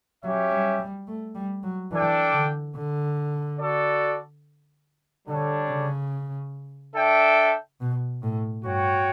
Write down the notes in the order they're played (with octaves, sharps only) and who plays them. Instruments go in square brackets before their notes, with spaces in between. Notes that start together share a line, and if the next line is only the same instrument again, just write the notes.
[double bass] F#3 [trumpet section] C#4 G4 C#5 E5
[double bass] G3
G3
A3
G3
F#3
[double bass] E3 [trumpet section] D4 A4 D5 G5
[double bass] D3
D3
[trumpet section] F#4 A4 D5
[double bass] D3 [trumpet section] G3 D4 A4 C#5
[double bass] C#3
[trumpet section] D4 A4 E5 G5
[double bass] B2
A2
[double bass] G2 [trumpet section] F#4 C#5 G5